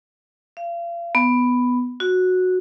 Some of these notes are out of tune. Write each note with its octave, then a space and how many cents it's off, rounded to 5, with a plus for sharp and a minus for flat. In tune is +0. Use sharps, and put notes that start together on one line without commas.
F5 -35
B3 +5
F#4 -10